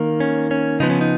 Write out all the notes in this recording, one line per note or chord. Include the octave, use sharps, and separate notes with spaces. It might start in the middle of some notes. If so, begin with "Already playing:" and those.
Already playing: D#3 A#3
C#4
C#4
C#3 F3 B3 D#4
C#4
D#4